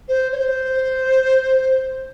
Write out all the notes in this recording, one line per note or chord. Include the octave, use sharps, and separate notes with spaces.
C5
C#5
C5